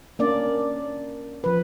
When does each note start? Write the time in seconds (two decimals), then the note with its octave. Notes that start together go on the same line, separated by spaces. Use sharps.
0.19 A#3 C#4 D4 D5
1.44 F3 B4